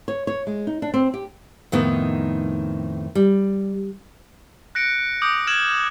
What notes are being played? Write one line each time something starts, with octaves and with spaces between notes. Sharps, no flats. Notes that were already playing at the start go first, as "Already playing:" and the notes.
C#5
C#5
G#3
D#4
D4
C4
G4
F2 A2 D#3 A3 B3 D#4
G3
F#6 A#6 C#7 D7
D6 D#6 G6 D7
F6 G#6 E7 F#7